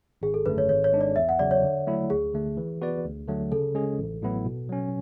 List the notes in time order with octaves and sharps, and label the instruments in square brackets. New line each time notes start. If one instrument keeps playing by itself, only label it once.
[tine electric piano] G#1 [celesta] G#4
[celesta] A4
[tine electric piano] F#2 D3 A3 [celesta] B4
[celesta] C#5
[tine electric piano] G#1 [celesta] C#5
[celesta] C#5
[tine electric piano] G#2 G#3 D4
[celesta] D5
[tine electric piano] E2 [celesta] E5
[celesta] F#5
[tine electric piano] C#3 F#3 [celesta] D5
[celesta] C#5
[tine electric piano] D3
F#3 A3 E4
[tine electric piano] D2 [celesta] G#4
[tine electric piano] D3 A3
E3
B3 F#4 B4 D5
D2
D3 F#3 A3
[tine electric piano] C#3 [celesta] A4
[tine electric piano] G#3 C#4 G#4
A1
A2 F#3 B3 E4
B2
F#3 C#4